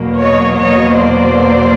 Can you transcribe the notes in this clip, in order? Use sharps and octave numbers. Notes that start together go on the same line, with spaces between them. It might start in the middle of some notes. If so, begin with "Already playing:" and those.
Already playing: E2 B2 F#3 A#3
C#5 D#5
C#5 D#5
C5 D5